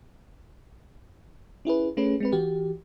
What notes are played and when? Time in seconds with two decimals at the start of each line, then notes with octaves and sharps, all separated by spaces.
1.65 C#4 E4 G#4 B4
1.97 A3 C#4 G#4 B4
2.20 G#3 C4 B4
2.32 E3 F#4 G4